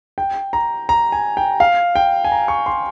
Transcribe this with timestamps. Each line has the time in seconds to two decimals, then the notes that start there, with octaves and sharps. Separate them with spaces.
0.18 G5
0.53 A#5
0.89 A#5
1.12 G#5
1.37 G5
1.60 F5
1.96 G5
2.24 G#5
2.32 A#5
2.48 C#6
2.66 C6